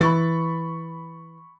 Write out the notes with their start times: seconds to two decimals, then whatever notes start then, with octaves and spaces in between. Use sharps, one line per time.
0.01 E3 B5 C#6 A6